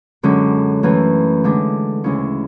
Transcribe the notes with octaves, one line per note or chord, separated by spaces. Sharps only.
F#2 D3 G#3 C#4
F#2 E3 A3 C#4
D3 G#3 D4
D2 C#3 G#3 C#4 E4